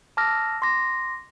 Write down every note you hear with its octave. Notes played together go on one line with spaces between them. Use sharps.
A5 D6 E6 F6 A#6
C6 D6 A#6